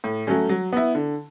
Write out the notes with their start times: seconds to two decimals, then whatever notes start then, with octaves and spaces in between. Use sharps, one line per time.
0.04 A2
0.27 F#3 A3 C#4
0.49 F#3
0.73 B3 E4
0.95 D3